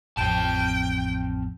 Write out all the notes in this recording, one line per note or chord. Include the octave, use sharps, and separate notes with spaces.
A1 F2 C4 G5 A5